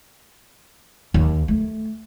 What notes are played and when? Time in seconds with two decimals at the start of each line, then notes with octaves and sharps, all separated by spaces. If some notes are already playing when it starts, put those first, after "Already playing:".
1.14 D#2
1.48 A3